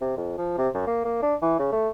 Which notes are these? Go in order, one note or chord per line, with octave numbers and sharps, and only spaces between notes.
C3
F2
F3
C3
F#2
A#3
A#3
D4
E3
C#3
A3